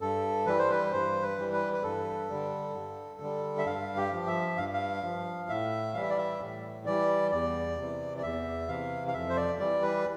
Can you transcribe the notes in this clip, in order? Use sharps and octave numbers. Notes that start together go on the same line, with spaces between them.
G2 A4
E3 G3 B4
C5
B4
G2 C5
B4
E3 G3
B4
B4
G2 A4
D3 G3
G2
D3 G3
E5
G2 F5
G4
F3
E5
G2 F5
F5
F3
A2 E5
E3 G3 F5
E5
D5
E5
A2
E3 G3 D5
E2 D5
C3 E3
D5
E2 E5
C3 E3 F5
F5
F2 E5
C5
D5
E3 G3 D5
B4